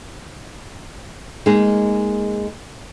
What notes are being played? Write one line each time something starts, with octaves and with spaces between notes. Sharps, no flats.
G#3 A#3 D#4 G#4